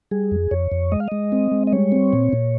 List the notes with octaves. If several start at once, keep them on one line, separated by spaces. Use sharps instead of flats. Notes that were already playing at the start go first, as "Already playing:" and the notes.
G3 G#4
F2
F2 C#5
F2
G#3 D#5
F5
G#3 D#5
C4
G#3
D#5
G3 C#5
C4
A#2
A#2